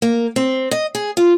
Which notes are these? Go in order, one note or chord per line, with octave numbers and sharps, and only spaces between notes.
A#3
C4
D#5
G#4
F4